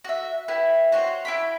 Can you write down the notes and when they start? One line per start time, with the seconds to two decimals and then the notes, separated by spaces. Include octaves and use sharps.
0.04 F#4 E5
0.48 E4 G4 B4
0.92 F#4 C5 C#5
1.25 E4 G5 B5